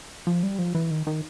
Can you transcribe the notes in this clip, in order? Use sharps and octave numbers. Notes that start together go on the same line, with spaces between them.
F3
G3
F3
E3
D#3
D#3